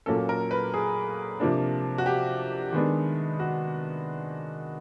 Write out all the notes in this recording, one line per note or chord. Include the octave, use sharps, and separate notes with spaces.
A#2 F#3 A#3 C#4 A4
A#4
B4
G#4
C3 F3 A#3 D4
F#4
G4
D#3 G#3 B3 D4
F#4